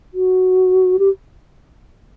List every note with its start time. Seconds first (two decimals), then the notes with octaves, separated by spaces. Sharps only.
0.14 F#4
0.99 G4